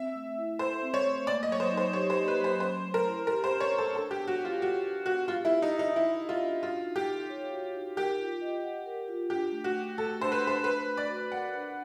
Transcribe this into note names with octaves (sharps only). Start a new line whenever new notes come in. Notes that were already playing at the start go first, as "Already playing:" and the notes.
Already playing: C4 E5
A3
E4
A4 C5
C4
C#5
A3
A#3 D5
D#5
F#3 C#5
C5
D#4
C5
G4 C#5
C5
A#3
B4
F#3
C5
C#4 C5
A3
A#4
E4
G4 A#4
C5
C#4
C#5
A3
A4
D4 A4
G4
B3
F#4
G4
F4
F#4 B4
D4
B3 F#4
F4 G4
E4
D4
D#4
C5
D#4
E4 E5
G4
F4
D4
F4 F#4
D#4
G4
A4
C#5
F#4
D#4
G4 A#4
F4
D#5
F#5
A#4
F4
D4 G4
A3
F#4
F#4
A3 A4
D4 C5
B4
A3
C5
D4 B4
A3
D5
F#4
A#4 F#5
D4